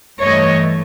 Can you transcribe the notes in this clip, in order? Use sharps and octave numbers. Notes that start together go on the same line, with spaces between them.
G2 E3 A3 C#5 D#5